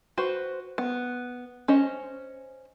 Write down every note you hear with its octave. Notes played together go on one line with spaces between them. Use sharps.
F#4 B4 C5
B3
C#4 C5 D#5